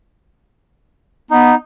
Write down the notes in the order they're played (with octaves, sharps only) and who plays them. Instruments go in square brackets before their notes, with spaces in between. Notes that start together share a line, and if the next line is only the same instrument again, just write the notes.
[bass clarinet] B3 [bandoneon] D#4